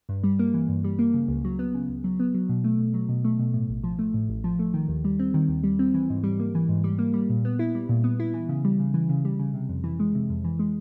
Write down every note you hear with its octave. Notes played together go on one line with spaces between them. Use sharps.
G2
G3
A#3
E3
G2
G3
A#3
C#3
C#2
F#3
B3
C#3
C#2
F#3
B3
F#3
B2
A3
B2
F#3
B2
A3
B2
A2
A1
F3
A3
A2
A1
F3
A3
D#3
D#2
G3
C4
D#3
D#2
G3
C4
E3
G#2
G3
A#3
E3
G#2
G3
A#3
G3
A#2
B3
E4
G3
A#2
B3
E4
E3
C#3
G3
C#3
E3
C#3
G3
C#3
C3
F2
E3
G#3
C3
F2
E3
G#3